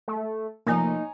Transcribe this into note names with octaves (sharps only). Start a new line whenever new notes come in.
A3
C3 F3 A3 A#3 D#4 C#5 G#5 A#5